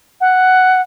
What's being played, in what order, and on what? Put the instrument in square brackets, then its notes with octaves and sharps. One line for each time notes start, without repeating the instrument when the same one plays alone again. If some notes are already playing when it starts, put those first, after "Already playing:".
[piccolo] F#5